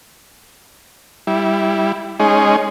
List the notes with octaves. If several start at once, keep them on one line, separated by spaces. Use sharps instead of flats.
G3 E4
G#3 C#4 D#4 G#4